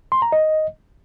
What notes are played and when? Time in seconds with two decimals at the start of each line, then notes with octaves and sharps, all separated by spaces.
0.12 C6
0.22 A#5
0.32 D#5